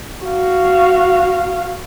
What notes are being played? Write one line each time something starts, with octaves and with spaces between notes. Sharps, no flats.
F#4 F5